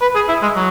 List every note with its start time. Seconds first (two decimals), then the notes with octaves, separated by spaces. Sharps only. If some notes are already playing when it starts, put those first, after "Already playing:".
0.02 B4
0.15 G#4
0.28 E4
0.42 G#3
0.56 F#3